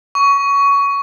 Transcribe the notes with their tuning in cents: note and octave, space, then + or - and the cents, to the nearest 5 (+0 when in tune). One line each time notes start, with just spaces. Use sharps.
C#6 +20